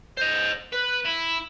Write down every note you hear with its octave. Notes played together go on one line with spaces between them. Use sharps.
C5 D#5
B4
E4